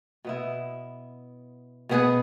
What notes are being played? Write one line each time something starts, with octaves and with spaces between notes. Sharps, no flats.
B2 B3 E4
B2 B3 G#4 B4